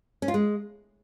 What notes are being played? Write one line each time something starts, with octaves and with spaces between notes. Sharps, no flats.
C#4
F4
G#3